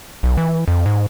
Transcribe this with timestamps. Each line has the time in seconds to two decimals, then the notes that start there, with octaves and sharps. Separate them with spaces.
0.23 B1
0.37 E3
0.68 F2
0.86 G#2